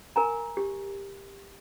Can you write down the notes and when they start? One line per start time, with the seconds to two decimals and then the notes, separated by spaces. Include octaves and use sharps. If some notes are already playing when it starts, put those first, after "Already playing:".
0.16 A#4 G#5 A#5
0.57 G4